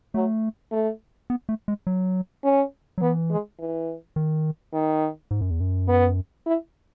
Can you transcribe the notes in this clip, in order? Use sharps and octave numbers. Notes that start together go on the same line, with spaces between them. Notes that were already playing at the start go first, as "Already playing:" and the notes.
F#3 A3
A3
B3
A3
G#3
F#3
C#4
F#3
E3 B3
G#3
E3
D#3
D#3
G#2
F#2
E2
F#2
B3
E4